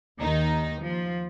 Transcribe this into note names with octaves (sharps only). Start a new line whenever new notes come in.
D#2 D#3 D#4
F3